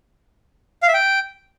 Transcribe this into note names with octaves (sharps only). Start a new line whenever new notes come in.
F5
E5
G5